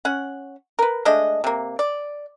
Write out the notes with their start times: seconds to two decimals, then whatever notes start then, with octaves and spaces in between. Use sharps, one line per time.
0.05 C#4 F#5
0.79 A#4 B4
1.05 G#3 A3 D4 D#5
1.44 C3 A#3
1.79 D5